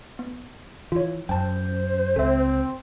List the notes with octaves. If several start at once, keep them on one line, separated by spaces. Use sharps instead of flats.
B3
E3 F4 C#5
F#2 C5 G5 A5
C#2 C4 A4 E5